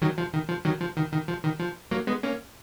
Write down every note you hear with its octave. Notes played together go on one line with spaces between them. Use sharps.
D#3 F#3
F3
D#3
F3
D#3 F#3
F3
D#3
D#3
F3
D#3
F3
F#3 A#3
G#3 B3
A#3 C#4